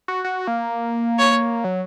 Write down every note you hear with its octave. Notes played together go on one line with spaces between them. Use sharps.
F#4
F#4
A#3
C#5
F#3